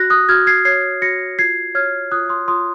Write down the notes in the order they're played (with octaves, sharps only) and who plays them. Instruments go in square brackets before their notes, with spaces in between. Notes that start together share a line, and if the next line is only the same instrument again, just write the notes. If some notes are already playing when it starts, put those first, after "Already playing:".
Already playing: [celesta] F#4 F#6 A#6
D#6 F#6
F#4 F6 G#6
G#6 C7
C#5 G#6 C7
F#4 A#6 C#7
F4 G#6 C7
C#5 F6 G#6
F4 D#6 F#6
C6 D#6
F4 C6 D#6